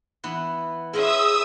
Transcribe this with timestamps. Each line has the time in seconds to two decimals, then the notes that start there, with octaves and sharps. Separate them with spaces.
0.24 E3 B3
0.93 C#4 E4 F4 G#4 D#5 E5 D#6 E6